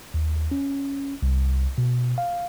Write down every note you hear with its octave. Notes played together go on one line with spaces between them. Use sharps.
D#2
C#4
C2
B2
F5